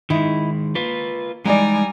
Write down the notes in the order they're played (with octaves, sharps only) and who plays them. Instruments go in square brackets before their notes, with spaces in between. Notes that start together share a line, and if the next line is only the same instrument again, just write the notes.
[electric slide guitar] D#3 G#3 [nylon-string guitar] D#4 E4
[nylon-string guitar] A#3 [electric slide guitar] F4 B4
[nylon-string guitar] E3 D#4 D5 [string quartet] G3 G#5 A#5 [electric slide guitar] G#3